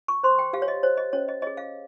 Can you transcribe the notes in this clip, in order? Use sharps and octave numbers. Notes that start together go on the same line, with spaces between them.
C#6
C5 C6
G5
G4 F5
C#5
D#5
C5 C#5
D#5
C#4 C#5
D#5
G#4 C#5 D#5
F5